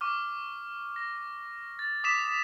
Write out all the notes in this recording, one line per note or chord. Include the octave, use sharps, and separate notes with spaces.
C#6 D6 F6
A#6
A6
D6 D#6 B6 E7